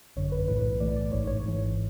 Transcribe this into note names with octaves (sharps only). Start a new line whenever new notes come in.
G#1 F#2 D3 C#5
B4
B1 A2 E3 B4
B1 A2 E3 A3 D5
D5
A1 G#2 E3 C#5
C#5
G#1 G#2 E3